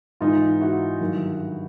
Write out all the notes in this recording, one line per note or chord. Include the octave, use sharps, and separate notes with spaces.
G#2 E3 D#4 F4
E4 F#4
G2 D#3 F#3